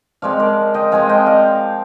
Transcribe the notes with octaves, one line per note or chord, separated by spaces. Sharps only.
F3 G#3 C4 D5 F5
A#4 D5
D#5 G5
F3 G#3 C4 F5 G#5
D#5 G5
D5 F5